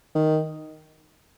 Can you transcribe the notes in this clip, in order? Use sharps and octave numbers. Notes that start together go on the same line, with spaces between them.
D#3